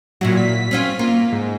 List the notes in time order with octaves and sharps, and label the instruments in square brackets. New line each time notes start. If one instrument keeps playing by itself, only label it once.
[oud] A#2 E4 F#4 [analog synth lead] F#3
[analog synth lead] B6
[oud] C4 C#4 F4
[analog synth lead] A#3 [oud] F4
[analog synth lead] G#2